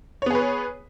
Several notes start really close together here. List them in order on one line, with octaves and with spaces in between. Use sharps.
C#5 B3 G#4 B4